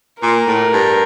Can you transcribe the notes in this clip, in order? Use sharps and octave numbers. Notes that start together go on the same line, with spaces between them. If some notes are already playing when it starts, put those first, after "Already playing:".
A#2 A#4
A2
G2